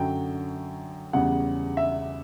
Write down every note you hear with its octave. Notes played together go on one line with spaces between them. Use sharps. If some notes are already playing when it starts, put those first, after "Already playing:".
Already playing: F#2 D3 F#3 G5
E2 C#3 G3 F#5
E5